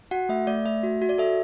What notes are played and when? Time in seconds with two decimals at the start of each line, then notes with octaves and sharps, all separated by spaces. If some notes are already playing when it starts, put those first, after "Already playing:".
0.11 F#4 F#5
0.29 A3 E5
0.47 A3 D5
0.65 A3 E5
0.83 F#4
1.02 F#4
1.09 D5
1.18 A4 E5